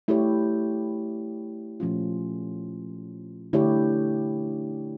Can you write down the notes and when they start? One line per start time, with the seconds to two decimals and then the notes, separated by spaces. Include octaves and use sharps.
0.08 A3 E4 G4 C#5
1.80 A#2 F3 A3 C#4 F4
3.53 D3 A3 E4 G4 C#5